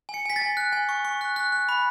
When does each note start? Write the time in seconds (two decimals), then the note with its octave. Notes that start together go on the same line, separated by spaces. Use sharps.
0.09 G#5
0.14 C#7
0.26 G#5 B6
0.36 A6
0.41 G#5
0.57 F#6
0.73 G#5
0.89 C#6
1.05 C#6
1.21 F#6
1.36 F#6
1.52 F#6
1.69 B5